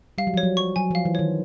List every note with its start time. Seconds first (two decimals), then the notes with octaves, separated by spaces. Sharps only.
0.18 G3 F5
0.27 F#3
0.34 F3
0.37 C#5
0.43 F#3
0.57 C#6
0.76 F#3 G#5
0.91 F3
0.95 F5
1.05 E3
1.15 D#3 C#5